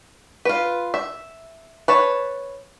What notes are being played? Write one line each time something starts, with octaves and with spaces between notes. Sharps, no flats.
F4 B4
E5
B4 C#5 A5